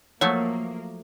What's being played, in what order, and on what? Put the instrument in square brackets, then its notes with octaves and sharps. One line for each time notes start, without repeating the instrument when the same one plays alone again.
[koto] F3 F#3 A3 [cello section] A#3 [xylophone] C#5